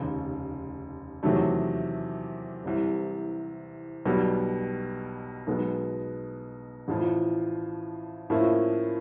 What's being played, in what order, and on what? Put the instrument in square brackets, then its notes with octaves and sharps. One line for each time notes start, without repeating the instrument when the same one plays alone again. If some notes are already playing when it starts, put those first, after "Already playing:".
Already playing: [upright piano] F1 D#2 C#3
E2 C3 D#3 F#3 A3
C2 C3 E3
B1 B2 G3
B1 B2 G#3 B3
A1 A2 F3
A2 F3 A#3 C#4 E4